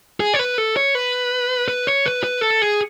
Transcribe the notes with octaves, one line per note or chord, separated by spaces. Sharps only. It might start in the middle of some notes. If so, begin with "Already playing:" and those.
G#4
C#5
B4
A4
C#5
B4
B4
C#5
B4
B4
A4
G#4